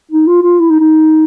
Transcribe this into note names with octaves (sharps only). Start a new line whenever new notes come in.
D#4
F4
F4
E4
D#4
D#4